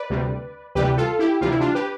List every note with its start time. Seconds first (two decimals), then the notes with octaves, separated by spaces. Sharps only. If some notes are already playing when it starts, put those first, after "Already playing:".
Already playing: B4 D5
0.10 D2 C3 G3
0.75 D2 C3 E3 G3 G4 B4
0.97 F4 A4
1.19 E4 G4
1.41 D2 C3 E3 G3 F4
1.51 E4
1.60 D4 F4
1.75 G4 B4